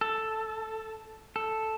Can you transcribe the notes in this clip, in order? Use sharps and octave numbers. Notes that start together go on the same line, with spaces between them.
A4
A4